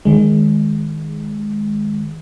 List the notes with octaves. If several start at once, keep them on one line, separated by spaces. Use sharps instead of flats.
D#3 G#3